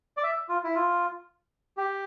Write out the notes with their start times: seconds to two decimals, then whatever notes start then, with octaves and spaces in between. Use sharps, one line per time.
0.17 D5
0.23 E5
0.49 F4
0.64 E4
0.75 F4
1.77 G4